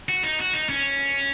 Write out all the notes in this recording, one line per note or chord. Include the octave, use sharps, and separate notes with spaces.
F#4
D#4
F#4
D#4
C#4